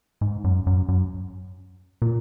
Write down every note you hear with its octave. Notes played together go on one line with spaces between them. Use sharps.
G#2
F#2
F#2
F#2
A#2